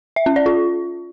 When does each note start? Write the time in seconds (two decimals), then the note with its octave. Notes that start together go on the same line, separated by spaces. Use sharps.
0.16 E5
0.26 C#4
0.36 D5
0.46 F4